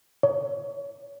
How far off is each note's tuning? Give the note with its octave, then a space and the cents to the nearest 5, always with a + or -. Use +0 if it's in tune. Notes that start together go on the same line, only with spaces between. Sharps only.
C#5 +30